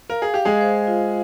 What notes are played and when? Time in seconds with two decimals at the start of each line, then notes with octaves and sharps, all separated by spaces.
0.10 A#4 F5
0.22 G#4
0.34 G4 F5
0.45 G#3 G#4
0.61 C5
0.87 F4